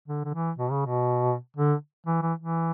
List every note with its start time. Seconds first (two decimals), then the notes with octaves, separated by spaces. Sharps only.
0.08 D3
0.24 D3
0.34 E3
0.58 B2
0.71 C#3
0.86 B2
1.57 D3
2.07 E3
2.22 E3
2.39 E3